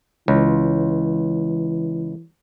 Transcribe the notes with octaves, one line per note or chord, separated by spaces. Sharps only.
C#2 E3